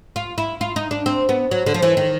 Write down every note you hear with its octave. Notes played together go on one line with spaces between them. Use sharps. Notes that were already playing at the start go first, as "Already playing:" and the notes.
F4
E4
F4
D#4
D4
C4
B3
F#3
D3
F3
E3
D#3